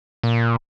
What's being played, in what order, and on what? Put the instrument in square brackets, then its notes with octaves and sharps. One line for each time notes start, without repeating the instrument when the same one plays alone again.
[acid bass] A#2